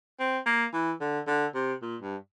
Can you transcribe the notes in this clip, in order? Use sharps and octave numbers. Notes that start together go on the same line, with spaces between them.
C4
A#3
E3
D3
D3
C3
A#2
G2